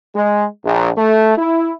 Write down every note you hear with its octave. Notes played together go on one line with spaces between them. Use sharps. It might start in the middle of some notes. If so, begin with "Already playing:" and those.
G#3
A#1
A3
E4